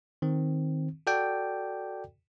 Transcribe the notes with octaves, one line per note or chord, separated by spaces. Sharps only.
D#3 C4
F#4 A4 D5 G5